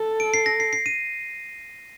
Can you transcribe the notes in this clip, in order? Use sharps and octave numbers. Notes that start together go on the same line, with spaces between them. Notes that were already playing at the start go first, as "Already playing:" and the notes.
Already playing: A4
D7
C7
A#6
C7
C7
D#7